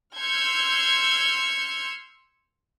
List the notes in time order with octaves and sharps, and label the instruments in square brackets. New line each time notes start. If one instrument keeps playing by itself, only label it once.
[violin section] C6 E6 F6 G6 G#6 C#7